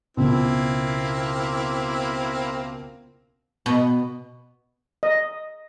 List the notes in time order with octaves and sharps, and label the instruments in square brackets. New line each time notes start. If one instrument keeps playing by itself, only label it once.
[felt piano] C#2 B2 [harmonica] A#3 C4 E4
[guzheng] B2
[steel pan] D#5